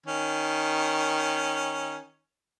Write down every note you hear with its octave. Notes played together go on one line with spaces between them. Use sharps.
D#3 C#4